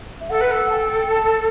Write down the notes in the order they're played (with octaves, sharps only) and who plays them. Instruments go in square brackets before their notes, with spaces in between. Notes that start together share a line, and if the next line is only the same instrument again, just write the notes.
[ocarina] E5
[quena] A4 [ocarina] F#5
[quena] B4
A4
[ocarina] A5
G5
A5